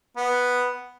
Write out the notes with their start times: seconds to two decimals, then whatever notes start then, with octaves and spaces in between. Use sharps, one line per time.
0.17 B3